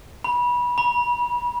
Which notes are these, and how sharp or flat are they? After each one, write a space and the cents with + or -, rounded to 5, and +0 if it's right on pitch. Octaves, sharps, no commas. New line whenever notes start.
B5 -25
B5 -40